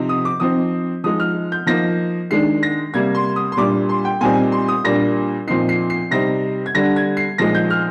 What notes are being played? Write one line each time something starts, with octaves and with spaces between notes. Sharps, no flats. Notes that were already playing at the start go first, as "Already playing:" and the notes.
Already playing: C3 F3 C4 D#4
D#6
D6
F3 C4 D#4 D#6
F3 G#3 D#4 D#6
F6
G6
F3 A#3 D#4 A#6
D#3 G#3 D4 C7
A#6
C3 G3 A#3 G#6
C6
D#6
C6
A#2 G3 D4 D6
C6
G5
A#2 G3 C4 D#4 G#5
C6
D#6
A#2 G3 A#3 D4 A#6
A#2 F3 C4 D#4 C7
C7
C7
C3 G3 C4 D#4 A#6
G#6
D3 G3 D4 A#6
G#6
C7
A#2 F3 G#3 D#4 A#6
G6
F6